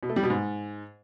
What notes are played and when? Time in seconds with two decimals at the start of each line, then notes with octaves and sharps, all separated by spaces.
0.03 B2
0.09 A3
0.16 G3
0.23 B2
0.30 G#2